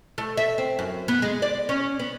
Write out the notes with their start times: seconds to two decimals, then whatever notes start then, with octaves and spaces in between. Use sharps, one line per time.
0.18 A3
0.37 E5
0.58 C4
0.79 F#2
1.08 B3
1.22 G#3
1.42 D5
1.69 C#4
1.99 B3